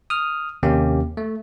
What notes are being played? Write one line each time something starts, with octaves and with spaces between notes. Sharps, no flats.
D#6 F6
D#2 C3 A#3 C#4 G4
A3